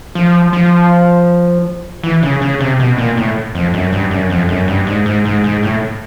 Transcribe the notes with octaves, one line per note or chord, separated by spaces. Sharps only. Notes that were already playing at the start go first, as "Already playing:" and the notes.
F3
F3
E3
C#3
C#3
C3
B2
A#2
A2
F2
F#2
G2
F#2
F2
F#2
G2
G#2
G#2
G#2
G#2
A2